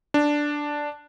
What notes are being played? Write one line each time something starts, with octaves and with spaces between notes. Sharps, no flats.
D4